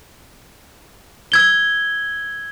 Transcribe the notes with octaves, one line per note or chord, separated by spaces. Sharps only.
E6 G#6 G7